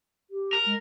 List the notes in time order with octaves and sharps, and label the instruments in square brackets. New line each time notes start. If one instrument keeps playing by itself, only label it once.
[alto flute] G4
[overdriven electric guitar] A#4
[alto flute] G#3